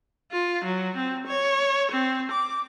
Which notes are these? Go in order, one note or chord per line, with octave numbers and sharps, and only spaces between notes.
F4
F#3
C4
C#5
C4
D6